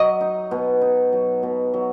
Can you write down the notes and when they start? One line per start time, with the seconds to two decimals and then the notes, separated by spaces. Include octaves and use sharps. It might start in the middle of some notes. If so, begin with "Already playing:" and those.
Already playing: F#3 D#5
0.21 D#4
0.51 B2
0.81 D#4
1.13 F#3
1.43 B2
1.74 F#3